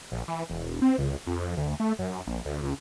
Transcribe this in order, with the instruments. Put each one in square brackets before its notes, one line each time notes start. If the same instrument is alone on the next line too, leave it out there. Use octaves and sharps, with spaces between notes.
[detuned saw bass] A#1
E3
E1
C4
C#2
F2
D2
A3
F#2
A#1
D2
C#2